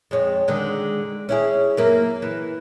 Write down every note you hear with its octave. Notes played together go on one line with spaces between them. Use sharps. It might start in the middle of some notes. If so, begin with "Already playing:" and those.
F2 G#3 C#5
D3 D#3 G#3
C#4 E4 G#4
F#2 A#3 E4
E3